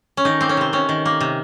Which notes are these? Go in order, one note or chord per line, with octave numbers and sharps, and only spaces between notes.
C#4
D#3 D#4
A#3 C4
C#4
C3 C4
C3 C#4
D#3
A#3
C3